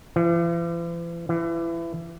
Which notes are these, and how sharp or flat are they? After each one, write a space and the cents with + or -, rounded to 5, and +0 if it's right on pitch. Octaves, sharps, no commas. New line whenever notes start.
E3 +45
E3 +25